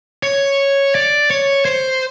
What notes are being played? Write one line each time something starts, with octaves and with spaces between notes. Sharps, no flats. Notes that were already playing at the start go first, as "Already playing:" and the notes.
C#5
D5
C#5
C5